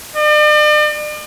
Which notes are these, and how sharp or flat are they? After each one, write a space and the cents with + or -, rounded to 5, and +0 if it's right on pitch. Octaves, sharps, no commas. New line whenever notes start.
D5 +40